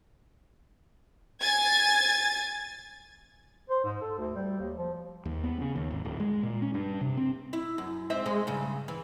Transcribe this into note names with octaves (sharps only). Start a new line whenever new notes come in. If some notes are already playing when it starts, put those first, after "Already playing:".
G#5 G#6 A6
C5
G#2
A4
D2
G3
D#2
F3
D#2
B3
C#3
D#2
G#1
D1
G#3
A#2
C#4
G2
C3
C4
E4
F#2
G#2 C4 E5
G#3
G2 C#3
E3